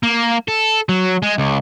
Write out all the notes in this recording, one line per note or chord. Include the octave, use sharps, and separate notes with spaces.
A#3
A4
F#3
G#3
C#2